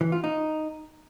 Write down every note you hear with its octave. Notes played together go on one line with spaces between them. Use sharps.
E3
F4
D#4